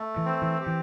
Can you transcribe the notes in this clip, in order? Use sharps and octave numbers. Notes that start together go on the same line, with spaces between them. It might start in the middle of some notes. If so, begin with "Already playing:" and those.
Already playing: A3
E3
C4
E3
G4
E3